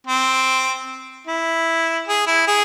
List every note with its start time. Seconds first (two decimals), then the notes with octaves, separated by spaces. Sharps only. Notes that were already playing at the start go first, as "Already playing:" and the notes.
0.07 C4
1.27 E4
2.08 G#4
2.27 E4
2.48 G#4